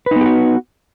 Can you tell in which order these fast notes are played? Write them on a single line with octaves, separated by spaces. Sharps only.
B4 D#4 B3 G4 F#4